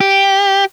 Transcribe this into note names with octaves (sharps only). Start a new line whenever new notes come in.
G4